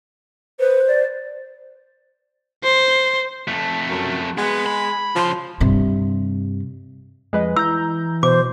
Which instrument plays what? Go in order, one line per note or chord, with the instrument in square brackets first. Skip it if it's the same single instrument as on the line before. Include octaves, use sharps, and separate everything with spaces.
[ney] B4 [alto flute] C5
[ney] D5
[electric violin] C5
[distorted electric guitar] F2 A3
[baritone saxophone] F#2
[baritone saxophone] G#3 [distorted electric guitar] B3 B4
[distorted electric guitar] B5
[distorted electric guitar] C#3 C6 [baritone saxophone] F3
[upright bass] G2 C3
[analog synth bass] F2 [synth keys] G#3 B4 D#5
[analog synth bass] E3 [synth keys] A#5 G6 [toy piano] E6
[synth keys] B2 [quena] C5 [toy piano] D6